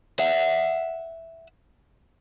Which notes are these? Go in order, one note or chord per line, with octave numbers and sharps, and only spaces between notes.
E5 F#5